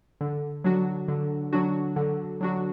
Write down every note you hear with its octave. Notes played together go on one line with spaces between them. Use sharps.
D3
F#3 D4 F#4
D3
F#3 D4 F#4
D3
F#3 D4 F#4